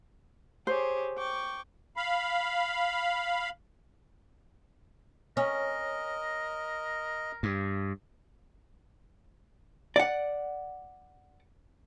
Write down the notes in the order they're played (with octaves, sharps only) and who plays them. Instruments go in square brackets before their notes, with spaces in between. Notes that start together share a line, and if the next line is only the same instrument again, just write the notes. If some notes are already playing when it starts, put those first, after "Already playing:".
[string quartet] G4 G#4 C#5 [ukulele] C5
[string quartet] G5 C#6 D6
[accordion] F5 B5
[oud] C#4 [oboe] A#4 [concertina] D#5
[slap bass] G2
[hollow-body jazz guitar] D5 F#5